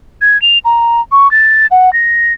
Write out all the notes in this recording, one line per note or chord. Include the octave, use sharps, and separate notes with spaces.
G#6
F7
A#5
C#6
A6
F#5
A#6